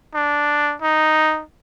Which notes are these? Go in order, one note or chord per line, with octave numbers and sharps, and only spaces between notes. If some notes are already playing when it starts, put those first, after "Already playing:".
D4
D#4